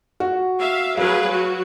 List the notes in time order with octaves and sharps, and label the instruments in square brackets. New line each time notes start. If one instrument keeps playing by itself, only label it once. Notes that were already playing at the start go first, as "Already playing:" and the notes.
[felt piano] F#4
[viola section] E5 F5
[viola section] F#3 G#4 B4 [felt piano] F5
[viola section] F#3 F#4